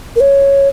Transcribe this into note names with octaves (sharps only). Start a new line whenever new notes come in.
A#4
C#5